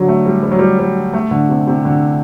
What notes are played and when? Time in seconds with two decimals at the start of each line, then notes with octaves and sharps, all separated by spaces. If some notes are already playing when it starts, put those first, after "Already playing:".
Already playing: D3 F#3
0.08 A3
0.26 G3
0.43 G3
0.52 F#3
0.59 G3
0.79 G3
1.13 A3
1.31 D3
1.49 C3
1.67 C3
1.85 D3